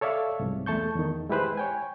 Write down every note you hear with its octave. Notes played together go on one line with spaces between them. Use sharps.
A4 C#5 D5 E5 F5
C2 F2 G#2 C3
E2 A3 A5 C#6 G6
E2 D#3
G#3 E4 G4 B4 C5 F#6
C#5 G5 G#5